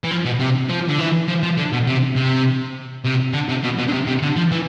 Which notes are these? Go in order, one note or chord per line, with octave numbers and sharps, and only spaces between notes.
E3
F3
B2
C3
F3
D3
E3
F3
F3
D3
B2
C3
C3
C3
D3
C3
B2
B2
D3
C3
C3
D3
F3
E3